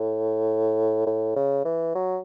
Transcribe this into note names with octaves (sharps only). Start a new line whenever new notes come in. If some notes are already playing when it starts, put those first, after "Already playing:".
Already playing: A2
A2
C#3
E3
F#3